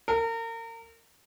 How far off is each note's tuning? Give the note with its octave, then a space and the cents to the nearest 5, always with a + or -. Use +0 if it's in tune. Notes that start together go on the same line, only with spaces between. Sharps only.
A#4 -35